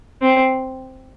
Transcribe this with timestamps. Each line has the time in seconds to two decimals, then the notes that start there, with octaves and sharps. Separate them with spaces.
0.22 C4